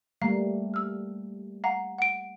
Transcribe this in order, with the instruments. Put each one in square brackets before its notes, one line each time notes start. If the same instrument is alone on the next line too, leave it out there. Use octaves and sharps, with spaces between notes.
[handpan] G3 A3 A#3 [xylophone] F5 A#5
[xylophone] E6 F6
F5 F#5 A#5
F#5 D7